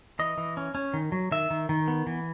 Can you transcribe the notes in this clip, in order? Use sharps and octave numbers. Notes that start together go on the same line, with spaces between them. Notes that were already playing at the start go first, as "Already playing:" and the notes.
E3 D#5
E3
C#4
C#4
D#3
F#3
D#3 E5
D#3
D#3
B3
E3